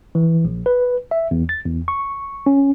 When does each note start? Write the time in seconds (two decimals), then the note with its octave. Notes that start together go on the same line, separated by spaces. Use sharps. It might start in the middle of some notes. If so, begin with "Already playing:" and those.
0.15 E3
0.45 A#1
0.66 B4
1.11 E5
1.31 E2
1.49 A6
1.65 E2
1.88 C#6
2.46 C#4